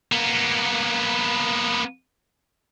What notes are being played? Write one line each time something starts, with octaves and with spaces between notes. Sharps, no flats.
A#3 B3